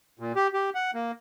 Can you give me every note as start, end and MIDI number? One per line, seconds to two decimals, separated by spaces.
0.19 0.32 46
0.36 0.48 67
0.53 0.70 67
0.75 0.91 78
0.94 1.12 58